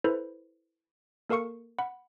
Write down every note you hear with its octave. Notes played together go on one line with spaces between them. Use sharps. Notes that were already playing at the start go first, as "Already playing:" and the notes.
E4 A4 B4 C5 B5
A#3 A4 A#4 F5 C#6 C#7
F#5 B5